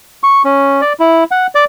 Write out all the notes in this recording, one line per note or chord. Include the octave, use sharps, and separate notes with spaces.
C#6
C#4
D5
E4
F#5
D5